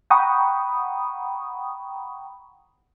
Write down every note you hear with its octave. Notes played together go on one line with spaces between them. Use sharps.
F#5 G5 A#5 B5 C#6 D#6